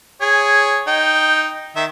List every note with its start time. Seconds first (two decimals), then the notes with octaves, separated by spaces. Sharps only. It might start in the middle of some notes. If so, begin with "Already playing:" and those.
0.21 G#4 C#5
0.87 D#4 G5
1.76 D#3 E5